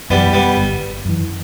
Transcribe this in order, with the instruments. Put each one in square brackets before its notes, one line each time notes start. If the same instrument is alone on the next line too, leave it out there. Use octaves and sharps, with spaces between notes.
[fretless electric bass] F#2 E3 [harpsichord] G3 B3
[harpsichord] G3 B3
[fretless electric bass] G1
F#2 E3